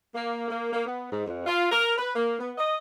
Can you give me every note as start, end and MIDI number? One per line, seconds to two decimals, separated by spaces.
0.15 0.48 58
0.48 0.73 58
0.73 0.86 58
0.86 1.09 59
1.11 1.24 44
1.27 1.44 41
1.46 1.66 65
1.71 1.93 70
1.98 2.12 71
2.16 2.35 58
2.40 2.52 59
2.58 2.77 75